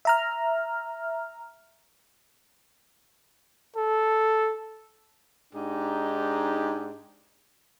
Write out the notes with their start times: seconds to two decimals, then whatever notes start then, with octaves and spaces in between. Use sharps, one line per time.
0.05 E5 A#5 F6
3.76 A4
5.54 G#2 D4 D#4 G4 G#4